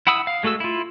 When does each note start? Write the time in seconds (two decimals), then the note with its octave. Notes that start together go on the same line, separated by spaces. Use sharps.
0.07 E4 F#5 B5 D#6 E6
0.27 F5
0.43 G#3 A3 F#4 A4 E6
0.60 E4 F4